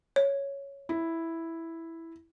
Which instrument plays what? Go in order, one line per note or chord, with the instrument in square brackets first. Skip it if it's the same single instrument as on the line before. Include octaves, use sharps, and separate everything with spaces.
[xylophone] C#5
[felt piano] E4